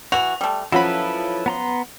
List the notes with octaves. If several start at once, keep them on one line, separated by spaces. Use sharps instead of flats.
E3 F#4 F7
G3 A3
F3 F#3 C#4 E4 A4 B4 B5
B3 A#5 C6